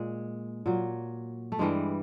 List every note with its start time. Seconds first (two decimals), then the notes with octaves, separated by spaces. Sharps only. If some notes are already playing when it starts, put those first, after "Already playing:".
Already playing: A#2 G#3
0.66 A#2 F#3
1.52 A3
1.59 G2 E3 G3 G#3